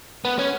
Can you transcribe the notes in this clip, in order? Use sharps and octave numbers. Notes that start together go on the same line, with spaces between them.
B3
C#4